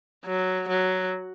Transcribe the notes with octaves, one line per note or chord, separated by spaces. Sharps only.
F#3
F#3